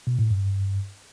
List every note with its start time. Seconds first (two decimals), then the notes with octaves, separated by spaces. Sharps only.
0.07 B2
0.19 A2
0.30 G2